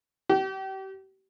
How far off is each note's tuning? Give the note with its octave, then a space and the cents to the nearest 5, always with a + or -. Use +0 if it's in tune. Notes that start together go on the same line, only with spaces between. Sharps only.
G4 -35